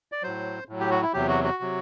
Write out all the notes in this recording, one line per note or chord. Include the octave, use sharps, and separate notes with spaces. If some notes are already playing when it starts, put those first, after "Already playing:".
D5
A2 F#3 C5
A2 F#3
G4
F#4
E4
E2 C3 F#3 G4
F#4
F#4
C3 F#3